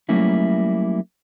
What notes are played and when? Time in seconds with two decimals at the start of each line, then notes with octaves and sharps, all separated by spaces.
0.09 F#3 G3 A3 A#3 C#4 E4